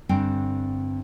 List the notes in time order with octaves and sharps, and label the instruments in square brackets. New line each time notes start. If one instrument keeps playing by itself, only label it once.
[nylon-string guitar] G2 D3 C4 G5 G#5